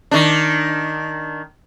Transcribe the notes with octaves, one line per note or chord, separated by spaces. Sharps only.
D#3 D4